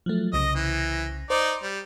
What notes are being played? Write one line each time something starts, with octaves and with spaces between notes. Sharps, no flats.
F3 F#3 A3
C2 C#3 D#5 A#6
E3
D#4 C5 D5
G3